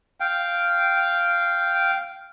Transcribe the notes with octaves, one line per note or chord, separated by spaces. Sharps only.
F5 G5